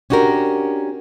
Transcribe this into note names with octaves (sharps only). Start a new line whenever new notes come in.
C#4 D4 F#4 G4 A#4